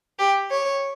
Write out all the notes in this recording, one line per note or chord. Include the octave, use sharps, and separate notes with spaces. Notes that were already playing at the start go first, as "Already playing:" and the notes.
G4
C#5